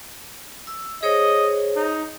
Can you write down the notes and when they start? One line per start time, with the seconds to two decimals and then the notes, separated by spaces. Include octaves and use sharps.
0.67 E6
1.03 G#4 C5 C#5 D#5
1.76 D#4